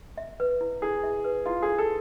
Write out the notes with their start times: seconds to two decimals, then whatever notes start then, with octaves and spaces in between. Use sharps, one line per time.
0.18 E5
0.40 B4
0.61 E4
0.82 E4 G#4
1.03 E5
1.24 B4
1.46 E4 F4
1.62 G#4
1.68 E4
1.78 A4